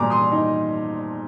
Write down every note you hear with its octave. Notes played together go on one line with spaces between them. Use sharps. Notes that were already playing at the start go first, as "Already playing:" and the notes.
Already playing: A#2 G3 A#5 C6 D6
C6 D#6
D#4